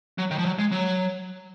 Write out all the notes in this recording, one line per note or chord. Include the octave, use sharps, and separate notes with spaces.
F#3
D#3
F3
F#3
G#3
F#3